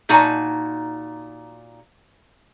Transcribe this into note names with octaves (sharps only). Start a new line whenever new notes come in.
A#2 D#4 F#4 G#5 A5